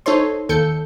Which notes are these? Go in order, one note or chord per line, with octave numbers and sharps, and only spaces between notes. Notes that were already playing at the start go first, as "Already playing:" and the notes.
D#4 A4 C5 C#5 C6
D#2 A4 G6 C#7